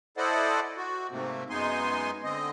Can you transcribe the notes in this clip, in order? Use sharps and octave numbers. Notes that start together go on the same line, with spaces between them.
E4 A4 C5 D5 D#5 F#5
F#4
G#2 C3 A3 A#3 C4
F#2 G#3 B3 D#4 G#5 C6
D3 C4 D#5